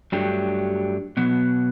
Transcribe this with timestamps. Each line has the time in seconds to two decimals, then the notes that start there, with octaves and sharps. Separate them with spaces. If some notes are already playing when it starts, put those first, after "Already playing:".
0.12 G2 F#3 A3 D4 G4
1.17 B2 F#3 B3